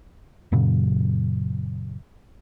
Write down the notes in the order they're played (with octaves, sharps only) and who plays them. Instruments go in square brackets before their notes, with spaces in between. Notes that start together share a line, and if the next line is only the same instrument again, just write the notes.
[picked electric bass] F#2 A#2 C#3 F#3